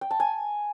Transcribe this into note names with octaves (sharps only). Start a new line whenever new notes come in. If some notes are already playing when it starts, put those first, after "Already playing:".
G5
A5
G#5